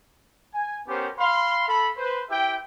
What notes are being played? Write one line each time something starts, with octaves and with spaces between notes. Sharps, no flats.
G#5
B3 C#4 G4 A#4 C5
F5 B5 C6
A4 B5
B4 C5
E4 G4 E5 G5